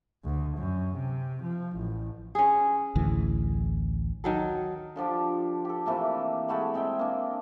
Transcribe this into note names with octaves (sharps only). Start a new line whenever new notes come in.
D2
F#2
C3
F3
A1
C#4 G#4
A1 D2 E3
D#3 F#3 A4
D3 F3 D4 G4
G4 A4
C3 E3 A3 A#3
G#3 A3 F#4 B5
G#3 C4 E5 G5
A#3 D4